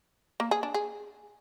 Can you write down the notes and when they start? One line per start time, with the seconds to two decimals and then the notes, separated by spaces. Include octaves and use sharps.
0.40 A#3
0.51 G#4
0.63 D4
0.74 G#4